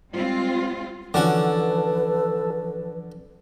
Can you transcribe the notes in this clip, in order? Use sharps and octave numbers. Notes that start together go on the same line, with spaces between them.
G3 G#3 C4 F4
D3 E3 F3 C#4 F#4 A4 B4 D6